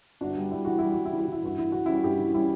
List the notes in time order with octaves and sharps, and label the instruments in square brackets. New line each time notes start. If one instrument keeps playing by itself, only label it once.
[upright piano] G1 [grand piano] D4 F#4
[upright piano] G3
[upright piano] G3 [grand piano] E4
[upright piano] E3 [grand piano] F#4
[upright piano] G3 [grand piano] E4
[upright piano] G3 [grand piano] F#4
[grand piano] E4
[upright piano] E3
[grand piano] F#4
[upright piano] E3 [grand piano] E4
[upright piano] G2 [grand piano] F#4
[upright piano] E3 [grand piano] E4
[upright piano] E3 [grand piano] F#4
[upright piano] G3 [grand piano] C#4 E4
[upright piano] G2 [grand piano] E4 G4
[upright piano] E3
[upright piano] G3 [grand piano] C#4 E4